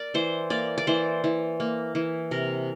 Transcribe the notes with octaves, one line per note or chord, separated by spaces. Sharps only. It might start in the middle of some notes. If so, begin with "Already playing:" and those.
Already playing: A#4 D5
E3 C5
A#3 D5
D5
E3 C5
E3
A#3
E3
C3 A#4